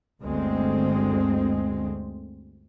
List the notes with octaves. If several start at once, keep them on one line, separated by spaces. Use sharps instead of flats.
G1 D2 G#3 C4